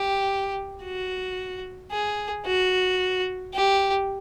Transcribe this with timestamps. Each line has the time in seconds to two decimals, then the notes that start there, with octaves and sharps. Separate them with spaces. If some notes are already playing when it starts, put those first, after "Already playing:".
Already playing: G4
0.84 F#4
1.92 G#4
2.46 F#4
3.54 G4